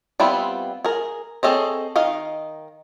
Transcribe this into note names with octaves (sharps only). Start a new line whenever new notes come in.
G3 B3 C4 E4 F4
G#4 A#4
C4 G#4 A4 C#5 D#5
D#3 D#5 F5